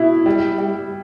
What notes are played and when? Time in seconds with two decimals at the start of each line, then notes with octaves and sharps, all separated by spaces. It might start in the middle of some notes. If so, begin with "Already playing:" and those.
Already playing: B2 E4
0.26 G3
0.58 G3